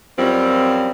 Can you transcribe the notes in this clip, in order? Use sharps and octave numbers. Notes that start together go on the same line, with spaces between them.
F#2 F3 G3 C4